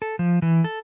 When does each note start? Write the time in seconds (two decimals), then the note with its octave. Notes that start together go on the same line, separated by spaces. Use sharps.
0.02 A4
0.19 F3
0.42 E3
0.64 A4